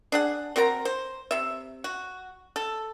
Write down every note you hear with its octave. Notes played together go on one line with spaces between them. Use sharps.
D4 G#4 F#5
C4 F#4 A#4 A#5
C5
C3 E5
F#4
A4